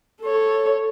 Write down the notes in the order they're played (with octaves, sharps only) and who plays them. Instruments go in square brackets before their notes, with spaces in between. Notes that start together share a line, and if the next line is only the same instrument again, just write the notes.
[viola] A4 C#5